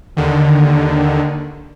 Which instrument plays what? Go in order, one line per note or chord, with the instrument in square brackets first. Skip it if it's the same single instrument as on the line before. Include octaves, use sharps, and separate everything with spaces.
[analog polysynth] D#2 D3 D#3